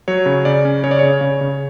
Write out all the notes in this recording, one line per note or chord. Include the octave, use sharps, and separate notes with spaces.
F#3 C#5
C#3
C#3 D5
C#4
C#3 C#5
D5
C#3 C#5
C#3
C#3